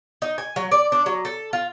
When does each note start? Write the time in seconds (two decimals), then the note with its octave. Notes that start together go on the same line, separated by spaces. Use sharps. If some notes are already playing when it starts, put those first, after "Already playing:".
0.22 D#4
0.38 G#5
0.56 F#3
0.71 D5
0.92 D4
1.06 F#3
1.25 A4
1.53 F4